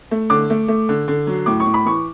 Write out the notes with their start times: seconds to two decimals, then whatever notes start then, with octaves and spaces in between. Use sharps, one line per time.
0.11 A3
0.30 D3 D6
0.50 A3
0.68 A3
0.89 D3
1.08 D3
1.27 F#3
1.46 A2 D6
1.60 C#6
1.66 A2
1.74 B5
1.85 E3 C#6